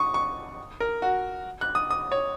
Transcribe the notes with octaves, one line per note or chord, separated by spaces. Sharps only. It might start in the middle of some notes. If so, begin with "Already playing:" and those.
Already playing: C#6 D#6
C#6
A#4
F#4
F#6
D#6
D#6
C#5